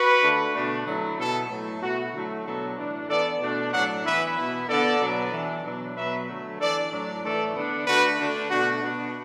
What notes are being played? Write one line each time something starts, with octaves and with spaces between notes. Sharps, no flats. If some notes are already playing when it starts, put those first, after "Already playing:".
Already playing: F#4 B4
D3 A3 D4
B2 A3 D4
D3 F#3 A3 E4
B2 B3 E4 A4
A2 F#3 A3
B2 A3 E4 F#4
D3 F#3 A3 E4
B2 F#3 B3 D4 A4
A2 E3 D4
E3 B3 D4 A4 D5
B2 A3 D4
A2 F#3 D4 D5 F#5
E3 B3 E4 B4 E5
B2 B3 E4
D3 B3 D4 A4 D5
B2 F#3 B3
E3 D4
B2 F#3 B3 D4
B2 F#3 B3 B4 E5
D3 F#3 A3
E3 D4 A4 D5
A2 F#3 D4
A2 E3 A3 A4 D5
D3 B3 D4
D3 A3 D4 F#4 B4
D3 A3 D4
B2 A3 D4 F#4
B2 B3 D4